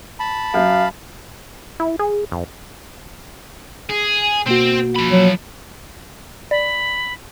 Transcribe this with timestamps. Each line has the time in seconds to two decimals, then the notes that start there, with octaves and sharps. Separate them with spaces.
0.20 A5 B5
0.54 F#2 F#3 F5
1.80 E4
1.99 G#4
2.32 F2
3.89 G#4
4.46 B2 A#3 C4 F#4 C5
4.96 F3 B5
5.11 F#3
6.51 D5 B5